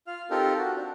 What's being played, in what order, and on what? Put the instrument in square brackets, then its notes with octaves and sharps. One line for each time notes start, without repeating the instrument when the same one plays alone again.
[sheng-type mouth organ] F4 F5 F6
C4 D#4 F4 G4 A4 A#4
F#4
D4